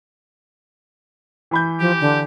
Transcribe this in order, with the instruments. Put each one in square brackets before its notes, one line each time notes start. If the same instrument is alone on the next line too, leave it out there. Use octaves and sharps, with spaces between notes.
[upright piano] E3 B5 G6
[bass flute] F3 [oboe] G4
[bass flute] D3